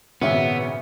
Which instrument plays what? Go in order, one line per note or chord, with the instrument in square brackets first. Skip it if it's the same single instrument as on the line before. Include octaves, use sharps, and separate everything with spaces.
[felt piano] G#1 C#3 F#4 [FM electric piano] A#2 E5 [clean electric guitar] B3 [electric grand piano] C#4